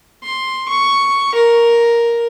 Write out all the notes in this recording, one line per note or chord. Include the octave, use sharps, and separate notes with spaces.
C6
C#6
A#4